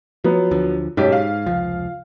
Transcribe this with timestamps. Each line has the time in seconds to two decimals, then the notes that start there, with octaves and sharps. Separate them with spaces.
0.24 F3 F#3 B3
0.51 D2 D3 F3
0.97 B1 G#2 C#4 G4
1.12 F5
1.46 F1 C#2 F3